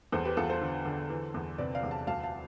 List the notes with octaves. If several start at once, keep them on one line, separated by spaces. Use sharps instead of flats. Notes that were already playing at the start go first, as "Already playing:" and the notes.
E2 A4 C5
G4 B4
E2 F4 A4
A4 C5
D3
D3
E3
E2
C3 B4 D5
D5 F5
E2
F5 A5
D2 F5 A5
F5 A5